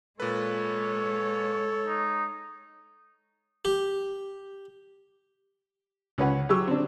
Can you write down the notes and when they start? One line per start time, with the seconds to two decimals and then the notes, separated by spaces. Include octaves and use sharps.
0.20 A#2 G#3 A4 B4 C#5
1.86 D#4
3.65 G4
6.18 C#2 C#4 B4 F#5
6.49 F#3 G4 G#4 C#6 E6
6.68 C4 D4